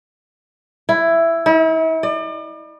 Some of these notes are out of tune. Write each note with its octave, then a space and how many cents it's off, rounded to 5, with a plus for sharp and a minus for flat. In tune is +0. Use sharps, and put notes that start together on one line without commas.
E4 +10
E4 -40
D5 +40